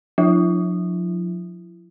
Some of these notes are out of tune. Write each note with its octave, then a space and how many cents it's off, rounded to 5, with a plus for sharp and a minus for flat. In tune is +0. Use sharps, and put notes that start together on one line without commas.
F3 +40 E4 +35